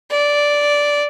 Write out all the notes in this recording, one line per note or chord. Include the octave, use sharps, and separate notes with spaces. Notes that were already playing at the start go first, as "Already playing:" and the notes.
D5